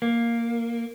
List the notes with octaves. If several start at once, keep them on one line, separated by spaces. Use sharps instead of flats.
A#3